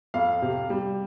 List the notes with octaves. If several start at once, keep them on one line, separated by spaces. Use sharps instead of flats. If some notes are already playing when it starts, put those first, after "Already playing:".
F2 F5
C3
G3